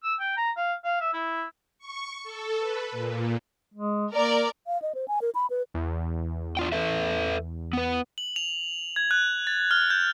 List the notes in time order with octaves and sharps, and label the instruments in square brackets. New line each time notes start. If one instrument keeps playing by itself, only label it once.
[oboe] E6
G5
A#5
F5
F5
E5
E4
[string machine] C#6
A4
B4
A#2
[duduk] G#3
[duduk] A#3 [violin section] A#4 D5
[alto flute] F5
D#5
C5
G#5
A#4
B5
B4
[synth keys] E2
[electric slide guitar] D4 F4 G5
A4 B4 E5
B3 B4
[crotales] F#7
F7
G#6
F#6
A6
F6
G6